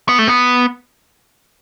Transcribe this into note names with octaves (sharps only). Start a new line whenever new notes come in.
B3
A3
B3